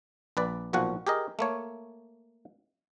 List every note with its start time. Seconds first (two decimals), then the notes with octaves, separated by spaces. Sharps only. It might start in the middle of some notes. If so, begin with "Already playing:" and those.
0.37 A#1 B4 D5
0.73 B1 A#2 F3 F#4 F#5
1.07 G4 G#4 A#4 D#5
1.39 A3 A#3 C#5